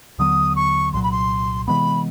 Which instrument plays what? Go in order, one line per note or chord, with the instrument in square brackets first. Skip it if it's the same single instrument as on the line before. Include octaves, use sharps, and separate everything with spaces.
[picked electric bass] D#2 D3 F#3 B3 [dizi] D#6
[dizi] C#6
[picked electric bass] C2 A#2 F#3 [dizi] C6
[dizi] B5
C6
[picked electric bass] C3 E3 G#3 B3 [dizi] B5